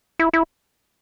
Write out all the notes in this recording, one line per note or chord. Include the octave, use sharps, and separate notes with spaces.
E4
E4